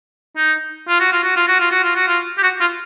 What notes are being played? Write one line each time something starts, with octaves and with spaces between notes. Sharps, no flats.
D#4
F4
F#4
F4
F#4
F4
F#4
F4
F#4
F4
F#4
F4
G4
F#4
F4